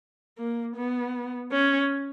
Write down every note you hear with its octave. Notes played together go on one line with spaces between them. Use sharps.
A#3
B3
C#4